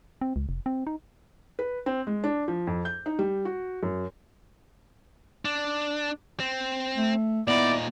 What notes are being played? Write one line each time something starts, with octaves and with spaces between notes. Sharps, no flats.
C4
C#2
F1
C4
D#4
B4
C4
G#3
D4
F3
F2
G6
D#4
G3
F#4
F#2
D4
C4
A3
A#2 B3 D#4 E4 D5